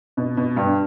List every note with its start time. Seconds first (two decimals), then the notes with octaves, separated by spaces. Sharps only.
0.17 B2
0.37 B2
0.56 G2